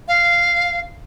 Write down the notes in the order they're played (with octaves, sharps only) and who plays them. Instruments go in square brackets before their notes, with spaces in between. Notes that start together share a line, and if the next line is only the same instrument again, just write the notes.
[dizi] F5